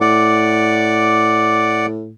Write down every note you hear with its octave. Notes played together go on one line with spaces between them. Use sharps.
A2 D5 F#5 D6